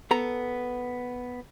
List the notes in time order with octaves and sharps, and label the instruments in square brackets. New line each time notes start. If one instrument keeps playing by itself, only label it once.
[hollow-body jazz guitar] B3 A4 A#5